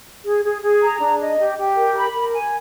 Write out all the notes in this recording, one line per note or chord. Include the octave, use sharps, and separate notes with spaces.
G#4
G#4
G#4
A#5
D4
D#5
G4
G4
A#4
B5
A#4
G#5